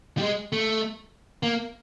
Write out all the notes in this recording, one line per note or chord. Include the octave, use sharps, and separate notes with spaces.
G3
G#3
A3
A#3